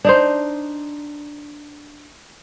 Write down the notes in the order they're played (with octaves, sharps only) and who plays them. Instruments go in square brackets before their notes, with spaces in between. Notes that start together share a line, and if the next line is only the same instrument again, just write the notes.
[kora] D4 D#4 C5